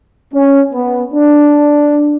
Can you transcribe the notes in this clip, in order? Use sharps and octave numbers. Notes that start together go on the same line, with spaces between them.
C#4
B3
D4